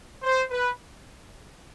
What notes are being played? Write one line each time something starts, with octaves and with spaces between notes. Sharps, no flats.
C5
B4